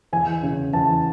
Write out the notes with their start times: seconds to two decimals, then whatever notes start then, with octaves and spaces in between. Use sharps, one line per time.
0.13 E2 G#5
0.43 C#3
0.73 E2 A5